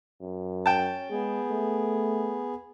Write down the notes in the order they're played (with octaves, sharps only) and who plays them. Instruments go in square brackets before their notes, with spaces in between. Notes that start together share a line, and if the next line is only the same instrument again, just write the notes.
[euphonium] F#2
[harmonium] C#4 [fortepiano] G5 A5
[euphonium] G#3 [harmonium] B3 G#4
[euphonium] A3